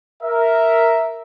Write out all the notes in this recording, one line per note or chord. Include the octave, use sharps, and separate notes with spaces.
A#4 E5